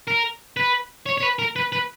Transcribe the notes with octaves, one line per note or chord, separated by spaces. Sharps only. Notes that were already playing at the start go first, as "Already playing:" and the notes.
A#4
B4
C#5
C#5
B4
A#4
B4
B4